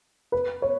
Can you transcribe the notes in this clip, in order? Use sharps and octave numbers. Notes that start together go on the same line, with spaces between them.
B4
C#5